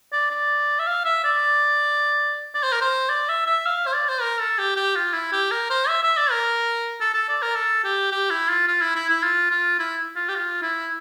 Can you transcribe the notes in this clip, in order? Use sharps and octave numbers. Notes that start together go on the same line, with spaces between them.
D5
D5
E5
F5
E5
D5
D5
C5
A#4
C5
D5
E5
E5
F5
C5
D5
C5
A#4
A4
G4
G4
F4
E4
G4
A#4
C5
E5
E5
D5
A#4
A4
A4
D5
A#4
A4
G4
G4
E4
F4
F4
E4
E4
E4
F4
F4
E4
F4
G4
F4
E4